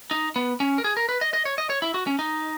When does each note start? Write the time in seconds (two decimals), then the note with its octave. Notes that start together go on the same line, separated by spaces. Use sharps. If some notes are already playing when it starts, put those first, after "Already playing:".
0.11 D#4
0.36 B3
0.60 C#4
0.78 A#4
0.84 G#4
0.97 A#4
1.09 B4
1.21 D#5
1.33 D#5
1.45 C#5
1.58 D#5
1.70 C#5
1.82 E4
1.94 F#4
2.07 C#4
2.19 D#4